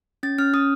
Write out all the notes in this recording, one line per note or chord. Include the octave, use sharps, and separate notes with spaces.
C#4 A6
C#4 F6
C#4 D#6